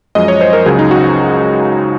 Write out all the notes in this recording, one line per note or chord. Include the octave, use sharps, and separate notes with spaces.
F#2 F3 G#3 D#5
C#5
C5
A#4
C#2 C#3 F#3 G#4
D#4
F#4